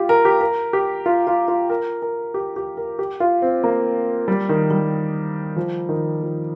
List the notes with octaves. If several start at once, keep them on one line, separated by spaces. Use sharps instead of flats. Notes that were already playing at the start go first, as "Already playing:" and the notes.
Already playing: F4 G4
A#4
G4
A#4
G4
F4
F4
F4
A#4
A#4
G4
G4
A#4
G4
F4
C4
A#3
G3
D#3
G3
F3
D#3
F3